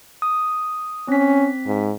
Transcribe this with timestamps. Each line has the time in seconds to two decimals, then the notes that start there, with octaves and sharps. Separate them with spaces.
0.22 D#6
1.08 C4 C#4 B6
1.66 G#2